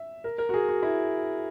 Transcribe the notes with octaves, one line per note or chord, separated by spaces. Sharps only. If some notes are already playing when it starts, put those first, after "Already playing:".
Already playing: E5
A#4
A#4
F#4
G#4
F#4
E4